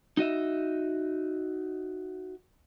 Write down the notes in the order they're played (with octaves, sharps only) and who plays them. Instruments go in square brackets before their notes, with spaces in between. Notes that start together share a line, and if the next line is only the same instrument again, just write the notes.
[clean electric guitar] D#4 F#4 D#5 E5